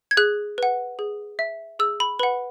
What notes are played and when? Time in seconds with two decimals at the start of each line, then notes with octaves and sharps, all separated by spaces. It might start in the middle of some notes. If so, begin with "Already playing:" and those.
0.11 G#6
0.17 G#4 F#6
0.58 B4 F#5
0.99 G#4
1.39 E5
1.79 G#4 E6
2.00 B5
2.19 B4 F#5 B5